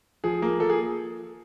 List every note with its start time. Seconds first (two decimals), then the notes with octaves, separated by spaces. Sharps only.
0.24 F3 G#4
0.42 A#3
0.60 F3 A4
0.70 G#4